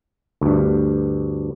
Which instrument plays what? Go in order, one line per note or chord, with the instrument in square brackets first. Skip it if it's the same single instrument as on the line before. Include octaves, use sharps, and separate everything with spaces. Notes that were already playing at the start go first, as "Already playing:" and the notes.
[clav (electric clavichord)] D2 G2